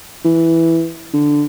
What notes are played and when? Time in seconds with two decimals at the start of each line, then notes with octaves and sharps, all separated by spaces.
0.25 E3
1.13 D3